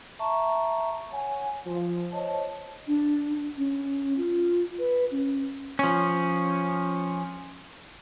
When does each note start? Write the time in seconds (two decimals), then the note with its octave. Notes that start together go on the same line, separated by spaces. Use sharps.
0.19 E5 A5 A#5 C#6
1.12 C#5 F#5 G#5
1.65 F3
2.12 C5 C#5 D#5 A5
2.87 D4
3.57 C#4
4.18 F4
4.79 B4
5.11 C#4
5.79 F3 C#4